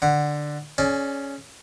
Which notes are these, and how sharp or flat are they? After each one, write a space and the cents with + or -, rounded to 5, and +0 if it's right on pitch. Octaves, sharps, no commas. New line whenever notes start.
D3 +10 F#5 +0
C#4 +0 G#4 +30 D5 +0